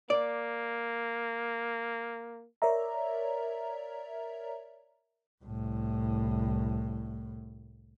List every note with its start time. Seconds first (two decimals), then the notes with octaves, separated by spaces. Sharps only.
0.10 A#3 D5
2.62 A#4 C#5 D5 E5 A#5
5.44 C2 A2